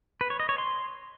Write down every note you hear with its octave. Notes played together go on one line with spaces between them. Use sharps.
B4
C#5
D#5
C#5
C6